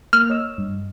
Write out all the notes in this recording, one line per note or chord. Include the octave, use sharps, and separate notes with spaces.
A#3 F6
C#5 D#5 E6
G2